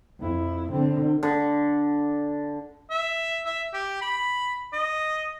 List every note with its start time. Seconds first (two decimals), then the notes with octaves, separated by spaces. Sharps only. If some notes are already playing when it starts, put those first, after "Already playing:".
0.20 F2 E4
0.72 D3 C4
1.23 D3
2.90 E5
3.45 E5
3.73 G4
4.02 B5
4.73 D#5